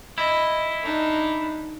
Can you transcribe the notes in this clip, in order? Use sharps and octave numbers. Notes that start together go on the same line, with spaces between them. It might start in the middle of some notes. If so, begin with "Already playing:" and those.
E4 D#5
D4 D#4